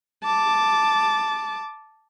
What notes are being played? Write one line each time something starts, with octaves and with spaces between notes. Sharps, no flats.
A5 D6